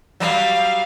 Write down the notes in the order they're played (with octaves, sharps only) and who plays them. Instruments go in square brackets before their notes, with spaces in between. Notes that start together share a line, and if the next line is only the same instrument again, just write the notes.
[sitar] F#3 G3 [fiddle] F5